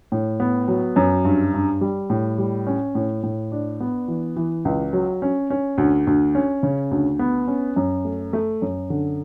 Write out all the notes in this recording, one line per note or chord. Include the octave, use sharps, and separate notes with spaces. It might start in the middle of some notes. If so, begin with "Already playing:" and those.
A2
B3
F#3
F#2
G2
G2
G3
A2
G3
C#4
A2
A2
D4
B3
E3
E3
C#2
F#3
C#4
C#4
D2
D2
C#4
C#3
D2
B3
C#4
F#2
A3
A3
F#2
D3